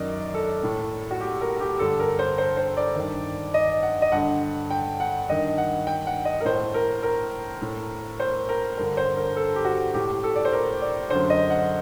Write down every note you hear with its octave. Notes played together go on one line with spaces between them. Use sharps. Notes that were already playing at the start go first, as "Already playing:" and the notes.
Already playing: F#2 D#3 D5 D#5
A4
A2
F#4
G4
A#4
G4
G2 D3 A4
A#4
C5
C5
C5
D5
G2 D#3
D#5
F#5
D#5
G2 D3 F#5
G5
F#5
G2 D#3 D#5
F#5
G5
F#5
D#5
A#4
A2 C5
A#4
A#4
A2
C5
A#4
G2 D3 A#4
C5
A#4
A4
G4
F#4
A2 G4
A4
D5
C5
A#4
D5
F#2 D3 C5
D#5
F#5